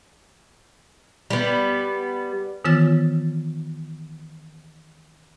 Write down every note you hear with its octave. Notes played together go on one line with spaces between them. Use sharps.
G3 B3
D#3 E3 B3 F4 F6 A6